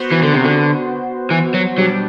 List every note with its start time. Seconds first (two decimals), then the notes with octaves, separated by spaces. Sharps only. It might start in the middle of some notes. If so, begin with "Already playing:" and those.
Already playing: B3 F#4 C5
0.12 E3
0.23 D3
0.34 C3
0.45 D3
1.30 E3
1.54 F#3
1.78 B2 F#3 G3 D4 G4